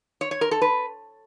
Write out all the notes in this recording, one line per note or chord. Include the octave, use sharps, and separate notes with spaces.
C#5
C#5
A#4
A4
B4